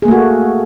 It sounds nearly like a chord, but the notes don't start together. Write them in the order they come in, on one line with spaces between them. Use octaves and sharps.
G#4 A#3 A3 F#4